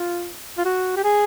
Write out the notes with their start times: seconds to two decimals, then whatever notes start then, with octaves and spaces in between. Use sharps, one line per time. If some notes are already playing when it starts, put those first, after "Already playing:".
Already playing: F4
0.58 F4
0.65 F#4
0.97 G4
1.04 G#4